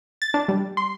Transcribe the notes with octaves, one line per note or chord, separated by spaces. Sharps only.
A6
D4
G3
C6